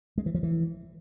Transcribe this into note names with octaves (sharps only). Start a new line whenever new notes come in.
G#3
E3
F3
E3